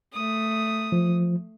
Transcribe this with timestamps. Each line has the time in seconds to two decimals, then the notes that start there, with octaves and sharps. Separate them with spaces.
0.13 A3 D#6
0.92 F3